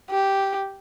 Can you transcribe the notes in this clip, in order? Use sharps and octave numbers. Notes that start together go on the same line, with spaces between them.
G4